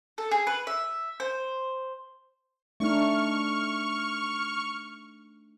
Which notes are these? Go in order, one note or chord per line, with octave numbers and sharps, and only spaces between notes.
A4
G#4
B4
E5
C5
A3 D4 D#4 C#6 F6